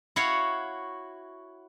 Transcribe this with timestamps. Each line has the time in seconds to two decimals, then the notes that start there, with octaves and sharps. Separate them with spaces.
0.16 E4 F#4 C#5 F5